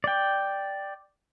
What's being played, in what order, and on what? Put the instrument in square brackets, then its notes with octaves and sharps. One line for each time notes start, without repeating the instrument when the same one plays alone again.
[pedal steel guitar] D5 G5